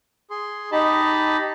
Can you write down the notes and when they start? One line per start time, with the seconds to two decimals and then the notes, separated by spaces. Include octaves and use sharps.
0.30 G#4 C6
0.72 D#4 G4 D#5 A5 B5